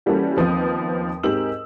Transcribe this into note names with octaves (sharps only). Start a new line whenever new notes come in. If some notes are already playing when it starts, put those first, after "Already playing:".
E3 G3 A#3 C#4 F#4 A4
D#2 F3 B3 C4 D#6
G#2 C4 G4 A#4 E6 F#7